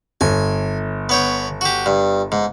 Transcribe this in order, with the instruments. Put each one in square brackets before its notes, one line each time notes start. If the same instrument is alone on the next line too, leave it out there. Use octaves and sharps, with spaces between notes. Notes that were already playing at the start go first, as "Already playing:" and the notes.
[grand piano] G1 [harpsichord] G#5
[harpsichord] B3 C#5 G5
F#4 G4
G2
G#2